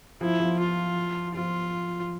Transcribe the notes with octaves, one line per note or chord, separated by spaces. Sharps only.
F3 E4
F3
F4
F3 F4